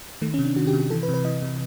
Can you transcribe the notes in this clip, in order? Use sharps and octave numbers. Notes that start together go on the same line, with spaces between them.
D#3 A3
C#4
C3
D4
D#3 F#4
G4
C3
G4
E3 A4
B4
C3
B4
E3 D#5
C3